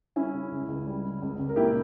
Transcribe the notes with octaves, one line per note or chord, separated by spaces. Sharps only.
G3 C#4 E4
C#3
C#2
C#2
G3
C#3
C#2
C#2
A#4
A#2 E4 G4